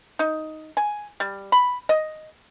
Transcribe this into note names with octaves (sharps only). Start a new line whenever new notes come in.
D#4
G#5
G3
B5
D#5